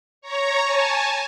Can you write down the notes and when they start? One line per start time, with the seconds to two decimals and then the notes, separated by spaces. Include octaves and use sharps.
0.21 C#5 A#5 C#6
0.63 G#5 A5